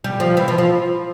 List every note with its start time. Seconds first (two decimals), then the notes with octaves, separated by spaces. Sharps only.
0.04 G3
0.20 F3
0.37 E3
0.48 F3
0.58 F3